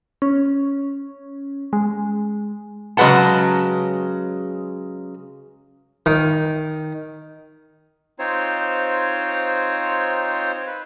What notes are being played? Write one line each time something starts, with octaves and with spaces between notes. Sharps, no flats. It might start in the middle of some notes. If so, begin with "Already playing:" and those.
C#4
G#3
C#3 F#3 G#3 B4 F#5 A5
D#3
C4 D#4 F4 C5 C#5
B4